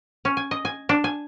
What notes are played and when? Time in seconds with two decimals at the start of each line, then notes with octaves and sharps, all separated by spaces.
0.25 C#4
0.37 G#5
0.51 D#5
0.65 G#5
0.89 D4
1.04 G#5